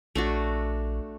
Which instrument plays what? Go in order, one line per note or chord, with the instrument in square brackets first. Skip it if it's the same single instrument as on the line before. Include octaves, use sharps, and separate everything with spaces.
[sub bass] A#1 [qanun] A3 D4 F#4